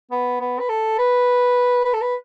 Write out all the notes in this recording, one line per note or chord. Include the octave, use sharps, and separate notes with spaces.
B3
B3
B4
A4
B4
B4
A4
B4